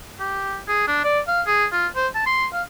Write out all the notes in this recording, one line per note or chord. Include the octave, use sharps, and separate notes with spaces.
G4
G#4
D4
D5
F5
G#4
F4
C5
A5
C6
F5